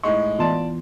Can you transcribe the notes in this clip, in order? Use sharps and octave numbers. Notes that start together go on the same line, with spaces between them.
A2 G#3 D#4 C#6
E3 B3 F4 D5 A5 C6